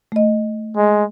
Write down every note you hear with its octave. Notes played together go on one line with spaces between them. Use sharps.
A3 D#5
G#3